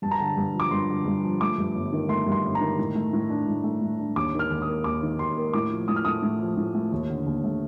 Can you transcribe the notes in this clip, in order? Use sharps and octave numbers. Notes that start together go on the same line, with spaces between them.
G2 A5
A#5
D3 A5
G2
F3
D6
G2 C6
D3
G2
F3
A3 D6
G2
G1
D#3
A3 C6
G2
C6
G1
A#5
D#3
A2
A3
A2
D4
A2
A3
A2
D4
D#2 D6
D#3
F6
D#2
D#6
A#3
D#2 D6
D#3
D#2 C6
A#3
A2 D6
F3
A2 D#6
F6
A3 D#6
A2
F3
A2
A3
D#2
D3
D#2
A3